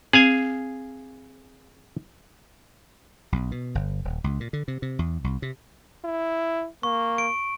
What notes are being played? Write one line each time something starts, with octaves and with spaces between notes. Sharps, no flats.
C4 G#4 F5 G#5
B1
B2
G1
D#1
C#2
A#2
D3
C3
C3
E2
C2
C3
E4
A#3 C#6
D7